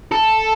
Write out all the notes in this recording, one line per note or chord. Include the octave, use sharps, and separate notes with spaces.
A4